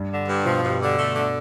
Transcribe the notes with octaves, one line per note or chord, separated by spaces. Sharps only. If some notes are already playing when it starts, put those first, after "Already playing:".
Already playing: G2 G3
D3
G2
B2 F3 B3
G2
D3
A3
D3